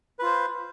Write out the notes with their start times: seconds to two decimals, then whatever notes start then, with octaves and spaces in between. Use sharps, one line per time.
0.19 B4
0.22 F4
0.26 C5